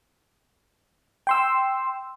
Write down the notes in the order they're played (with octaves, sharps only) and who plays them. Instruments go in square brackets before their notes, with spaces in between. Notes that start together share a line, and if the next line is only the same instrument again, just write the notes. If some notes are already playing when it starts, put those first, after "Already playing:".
[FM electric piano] G5 C6 E6